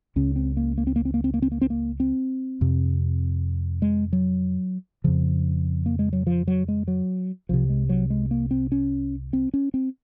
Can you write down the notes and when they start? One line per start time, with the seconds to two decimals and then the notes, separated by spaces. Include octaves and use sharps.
0.16 C#2 C#3 C#4
0.36 C4
0.57 A#3
0.78 A#3
0.87 C4
0.96 A#3
1.05 C4
1.14 A#3
1.24 C4
1.34 A#3
1.42 C4
1.52 A#3
1.61 C4
1.70 A#3
2.00 C4
2.61 F2 C3
3.82 G#3
4.13 F#3
5.04 F2 C#3 F3
5.86 A#3
5.99 G#3
6.13 F#3
6.27 F3
6.48 F#3
6.68 G#3
6.88 F#3
7.49 C2 C3 F3
7.69 G#3
7.89 F#3
8.10 G#3
8.31 A#3
8.51 C4
8.72 C#4
9.33 C4
9.54 C#4
9.74 C4